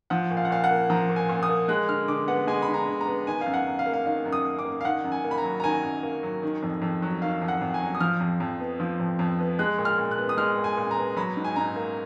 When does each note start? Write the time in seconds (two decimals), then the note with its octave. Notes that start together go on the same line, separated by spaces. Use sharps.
0.10 F3 F#5
0.31 A#2
0.37 F5
0.45 F#5
0.50 A#2 F5
0.64 F#5
0.70 A#3
0.90 F3 A#5
1.10 A#2
1.16 G#5
1.29 A#2
1.43 D#6
1.49 A#3
1.68 G#3 F#6
1.88 D3 F6
2.08 D3 D6
2.28 B3 F#5
2.47 G#3 G#5
2.62 B5
2.68 D3
2.74 A#5
2.87 D3
3.01 A#5
3.07 B3
3.27 D#3 G#5
3.41 F5
3.46 F#2
3.54 F#5
3.67 F#2
3.79 F5
3.86 A#3
3.93 F5
4.06 D#3 F5
4.25 F#2
4.33 D#6
4.45 F#2
4.59 D6
4.65 A#3
4.81 F5
4.85 D#3 F#5
5.04 F#2
5.12 G#5
5.24 A#3
5.31 B5
5.38 A#5
5.44 F#3
5.60 A#5
5.64 D#3 G#5
5.83 F#2
6.03 A#3
6.23 F#3
6.43 D#3
6.63 F2
6.82 F2
7.02 F#3
7.22 D#3 F5
7.42 F2
7.48 F#5
7.62 F2
7.74 G#5
7.81 F#3
7.95 D#6
8.01 F3 F6
8.20 F2
8.40 F2
8.60 B3
8.80 F3
9.00 F2
9.19 F2
9.39 B3
9.59 G#3 F#6
9.78 A#2
9.85 F6
9.98 A#2
10.11 F#6
10.18 B3
10.29 D#6
10.37 G#3 F6
10.58 A#2
10.64 G#5
10.77 A#2
10.91 A#5
10.97 B3
11.17 F#3 B5
11.37 G#2
11.44 G#5
11.56 G#2 A#5
11.76 A#3